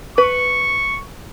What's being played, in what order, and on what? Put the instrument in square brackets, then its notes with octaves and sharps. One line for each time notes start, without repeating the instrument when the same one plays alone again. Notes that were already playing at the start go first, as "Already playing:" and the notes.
[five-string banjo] B4 [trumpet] C#6